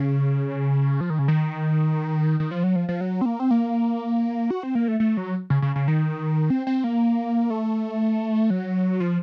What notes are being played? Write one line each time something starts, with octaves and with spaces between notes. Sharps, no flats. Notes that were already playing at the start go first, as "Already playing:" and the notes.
Already playing: C#3
F3
D#3
C#3
D#3
D#3
F3
F#3
F3
F3
F#3
C4
A#3
C4
A#3
F#4
C4
A#3
A3
A3
F#3
C#3
C#3
C#3
D#3
C4
C4
A#3
A3
F#3
F3